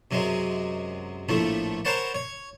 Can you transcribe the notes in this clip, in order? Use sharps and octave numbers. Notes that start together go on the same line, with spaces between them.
F#2 C3 F#3 G#3
A#1 A2 F3 A3
A#4 C5 C#5 F#5 A5 B5
C#5